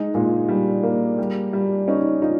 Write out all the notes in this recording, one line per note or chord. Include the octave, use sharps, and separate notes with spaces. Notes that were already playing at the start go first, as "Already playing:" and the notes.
Already playing: G#3 D#4
A#2 G#3
G3
A#3
G3
G3
C#4 D#4
D#4 F4